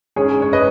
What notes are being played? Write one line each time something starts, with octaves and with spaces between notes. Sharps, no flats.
G#2 G#3 C#4 G#4 C#5
C#5
B4 D#5